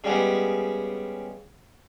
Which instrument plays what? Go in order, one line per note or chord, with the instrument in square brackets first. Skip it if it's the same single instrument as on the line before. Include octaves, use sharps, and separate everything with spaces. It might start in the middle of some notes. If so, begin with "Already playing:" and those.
[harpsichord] C#3 G3 G#3 B3